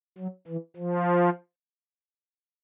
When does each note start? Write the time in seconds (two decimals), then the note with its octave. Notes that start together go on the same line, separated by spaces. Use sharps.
0.18 F#3
0.48 E3
0.77 F3